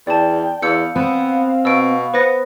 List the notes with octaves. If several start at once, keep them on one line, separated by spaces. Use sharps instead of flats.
E2 D5 G5 A5
E2 F5 E6 G6 C#7
B3 C4
B2 E6 D7
B3 B4 C5 A#6